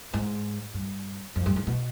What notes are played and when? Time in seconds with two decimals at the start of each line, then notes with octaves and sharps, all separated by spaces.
0.14 G#2
0.74 G2
1.36 F2
1.46 G2
1.56 G#2
1.67 B2